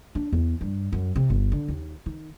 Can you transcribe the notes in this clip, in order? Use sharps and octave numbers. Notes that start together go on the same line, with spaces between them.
D4
E2
G2
F#2
C3
G1
D3
D#2
D#3